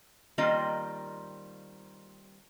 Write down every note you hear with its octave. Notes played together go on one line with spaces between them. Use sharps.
D#3 G3 A#3 C4 F4 D#5